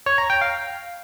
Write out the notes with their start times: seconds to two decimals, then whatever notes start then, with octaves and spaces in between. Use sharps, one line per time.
0.06 C#5
0.18 A#5
0.30 G5
0.41 F5